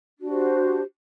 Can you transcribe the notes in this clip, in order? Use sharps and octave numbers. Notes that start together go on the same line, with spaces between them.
D4 F#4 G4 C5